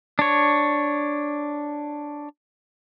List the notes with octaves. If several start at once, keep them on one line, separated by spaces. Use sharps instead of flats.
D4 C#5